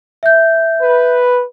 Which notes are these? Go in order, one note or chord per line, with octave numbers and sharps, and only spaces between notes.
E5 G6
B4